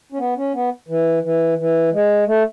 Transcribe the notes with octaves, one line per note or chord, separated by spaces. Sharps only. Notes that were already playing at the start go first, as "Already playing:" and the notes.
C#4
B3
C#4
B3
E3
E3
E3
G#3
A3